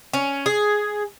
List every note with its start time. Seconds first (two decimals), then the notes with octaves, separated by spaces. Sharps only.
0.14 C#4
0.46 G#4